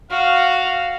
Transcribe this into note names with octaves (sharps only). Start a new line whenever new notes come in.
F#4 F5